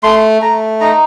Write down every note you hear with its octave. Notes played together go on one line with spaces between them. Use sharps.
A3 C6
A3 A#5
D#4 A#5